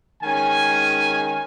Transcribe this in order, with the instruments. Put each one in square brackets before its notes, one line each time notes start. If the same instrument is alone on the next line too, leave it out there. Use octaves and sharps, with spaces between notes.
[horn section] D#3 G#3 C#4 G#5